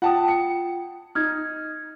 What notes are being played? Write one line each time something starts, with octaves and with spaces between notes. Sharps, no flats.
F4 F#5 G5 A5 D#6
C#7
D#4 F6 G#6